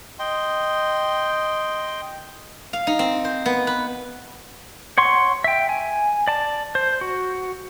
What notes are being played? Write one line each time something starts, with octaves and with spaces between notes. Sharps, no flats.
D#5 G5 C6
F5
D#4
C4
C5
B3
B4
C#5 F#5 C6 C#6
E5 G5
G#5
D5 A5
C5
F#4